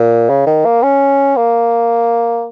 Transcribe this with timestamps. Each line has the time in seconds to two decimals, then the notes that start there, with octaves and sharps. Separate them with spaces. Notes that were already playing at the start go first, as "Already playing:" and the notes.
Already playing: A#2
0.29 C#3
0.46 D#3
0.65 A#3
0.83 C#4
1.36 A#3